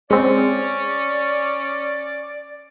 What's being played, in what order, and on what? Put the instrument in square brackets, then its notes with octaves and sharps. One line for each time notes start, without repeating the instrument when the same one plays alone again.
[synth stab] G#3 C4 [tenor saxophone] C#4 [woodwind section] D5